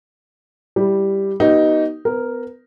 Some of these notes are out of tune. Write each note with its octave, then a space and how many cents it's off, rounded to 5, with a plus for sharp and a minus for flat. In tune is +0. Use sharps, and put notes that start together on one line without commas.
G3 +0 E4 +0
B3 -40 D#4 +0 G4 -40
B3 +30 A#4 +0